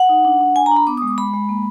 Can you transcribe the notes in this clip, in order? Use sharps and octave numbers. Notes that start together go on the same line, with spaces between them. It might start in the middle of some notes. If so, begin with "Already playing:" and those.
Already playing: F#5
D#4
D4
D4
D4 G#5
A#5
D4
B5
B3 D6
G#3 D#6
D6
G#3 B5
G#3
A#3